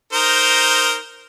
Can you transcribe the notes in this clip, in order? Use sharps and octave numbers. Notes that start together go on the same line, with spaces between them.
D#4 A#4 C5